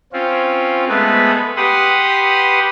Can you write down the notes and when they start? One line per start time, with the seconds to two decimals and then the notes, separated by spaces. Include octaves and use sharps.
0.13 C4 C#4 F4
0.88 G#3 A3 B3 B4
1.57 G4 B4 F#5 C6 D#6